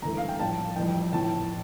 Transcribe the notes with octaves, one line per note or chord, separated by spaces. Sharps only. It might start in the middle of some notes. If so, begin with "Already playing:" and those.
G1 G2 E3 A3 A#5
F5
G5
A#1 A2 G3 A5
F1 F2 E3 G3 G5
A#1 A2 E3 A5